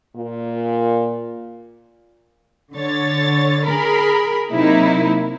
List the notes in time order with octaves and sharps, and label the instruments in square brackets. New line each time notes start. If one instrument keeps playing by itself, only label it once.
[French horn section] A#2
[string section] D3 C#5 A6
G#4 A#4 B5
C3 F#3 A#3 D#4 E4